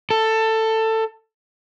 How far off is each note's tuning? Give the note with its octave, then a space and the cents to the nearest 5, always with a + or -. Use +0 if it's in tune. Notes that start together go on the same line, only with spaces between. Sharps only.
A4 +15